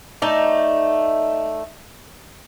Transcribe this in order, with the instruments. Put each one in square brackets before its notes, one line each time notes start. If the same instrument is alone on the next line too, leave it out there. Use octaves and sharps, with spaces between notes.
[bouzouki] A3 D#4 D5